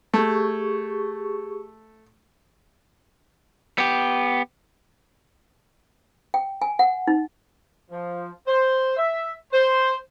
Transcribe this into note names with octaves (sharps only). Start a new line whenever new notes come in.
A3 G4 G#4 C#6
B3 G4
G5
G#5
F#5
D#4
F3
C5
E5
C5